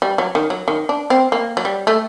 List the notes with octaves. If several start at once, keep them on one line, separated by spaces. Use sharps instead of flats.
G3
F#3
D#3
F#3
D#3
D4
C4
A#3
F#3
G3
A3